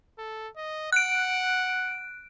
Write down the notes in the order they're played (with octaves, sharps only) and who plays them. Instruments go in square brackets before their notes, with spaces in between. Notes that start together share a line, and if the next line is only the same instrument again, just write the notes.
[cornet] A4
D#5
[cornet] F#5 [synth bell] F#6 D7